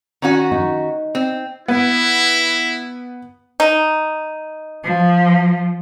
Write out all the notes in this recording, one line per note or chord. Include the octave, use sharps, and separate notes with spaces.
D#3 C#4 F#4
D#4
C4
B3 E4
D#4
F3